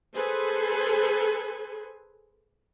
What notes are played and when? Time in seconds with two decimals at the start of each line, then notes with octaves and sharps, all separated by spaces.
0.16 G#4 A4 B4 C5 G#5